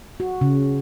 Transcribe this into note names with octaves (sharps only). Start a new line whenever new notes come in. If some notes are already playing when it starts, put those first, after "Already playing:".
F#4
C#3